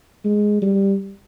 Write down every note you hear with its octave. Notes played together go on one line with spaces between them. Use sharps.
G#3
G3